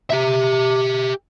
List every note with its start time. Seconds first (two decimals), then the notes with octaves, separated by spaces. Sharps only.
0.10 G4 E5